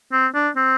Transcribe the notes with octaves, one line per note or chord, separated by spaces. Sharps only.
C4
D4
C4